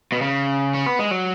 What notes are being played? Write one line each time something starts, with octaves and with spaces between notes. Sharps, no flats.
B2
C#3
C#4
B3
G#3
F#3